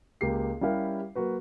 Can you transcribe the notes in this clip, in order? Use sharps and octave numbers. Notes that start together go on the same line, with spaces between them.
C#2 A#3 G4 C7
G3 C#4 E4 G4 A#4 F5
F#3 A#3 F#4 B4